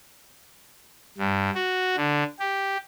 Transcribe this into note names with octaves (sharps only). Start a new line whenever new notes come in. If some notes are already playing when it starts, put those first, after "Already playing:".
G2
F#4
D3
G4